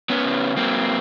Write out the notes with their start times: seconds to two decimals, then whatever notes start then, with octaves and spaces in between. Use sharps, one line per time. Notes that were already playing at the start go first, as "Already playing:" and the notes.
0.10 B3 C#4
0.25 C#3
0.57 F#3 A#3 C4